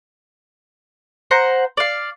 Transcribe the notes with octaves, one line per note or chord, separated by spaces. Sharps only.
C5 F#5 A#5
D5 F5